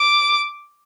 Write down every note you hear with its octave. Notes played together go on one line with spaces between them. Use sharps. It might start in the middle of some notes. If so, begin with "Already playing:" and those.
Already playing: D6